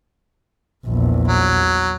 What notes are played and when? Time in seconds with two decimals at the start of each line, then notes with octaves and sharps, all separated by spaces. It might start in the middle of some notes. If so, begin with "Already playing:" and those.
0.87 A#1 E2
1.28 F#3